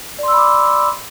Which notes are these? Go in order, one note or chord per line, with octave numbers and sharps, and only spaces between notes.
D5 B5 C6 D6 E6